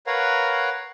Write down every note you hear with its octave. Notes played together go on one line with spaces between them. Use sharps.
A#4 B4 C#5 F5 F#5 A#5